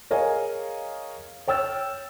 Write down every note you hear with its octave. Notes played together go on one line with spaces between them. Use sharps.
G#4 A#4 C#5 D#5 F5 G#5
C#5 G5 E6 F6 A6